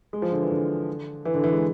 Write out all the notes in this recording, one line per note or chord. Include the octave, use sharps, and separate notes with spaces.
G#3
F3
D3
E3
D3
E3
D3
E3
G#3